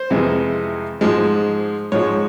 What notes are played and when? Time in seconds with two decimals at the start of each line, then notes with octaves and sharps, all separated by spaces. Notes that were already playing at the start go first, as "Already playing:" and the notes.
Already playing: C5
0.10 F2 C3 E3 G#3
1.01 G#2 F3 G#3
1.92 G#2 F3 G#3 C#5